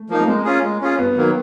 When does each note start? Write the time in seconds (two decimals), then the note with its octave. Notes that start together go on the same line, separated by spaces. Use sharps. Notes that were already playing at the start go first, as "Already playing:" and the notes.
Already playing: A3
0.09 F3 A#3 D#4
0.19 A3
0.28 G#3 A#3
0.45 C#4 F4 G#4
0.64 G#3
0.81 C#4 F4 G#4
0.99 G2 B3
1.17 D#3 F#3 A#3